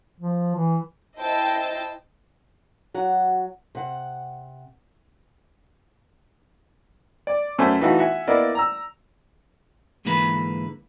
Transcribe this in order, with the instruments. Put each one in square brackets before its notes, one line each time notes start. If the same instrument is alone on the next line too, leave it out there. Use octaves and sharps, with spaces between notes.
[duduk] F3
E3
[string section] E4 C5 D#5 G5 A5
[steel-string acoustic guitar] F#3 F#4 F#5
C3 F#5
[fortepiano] D5
F#2 A3 C5 G#5
E3 A3 D#4 F4 F#4
E5 F#5 G#5
A#3 B3 E4 D5 D#5
A#5 E6
[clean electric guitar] G#2 D3 E3 A#3 B4 B5